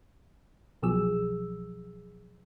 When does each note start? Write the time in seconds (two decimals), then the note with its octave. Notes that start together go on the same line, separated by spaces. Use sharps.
0.82 C2 B2 F3 F#3 G#4 E6